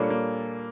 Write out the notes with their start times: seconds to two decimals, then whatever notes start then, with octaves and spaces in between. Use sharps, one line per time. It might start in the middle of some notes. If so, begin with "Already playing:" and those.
Already playing: A#2 G3 A#3 D4 A4 C#5
0.10 A#3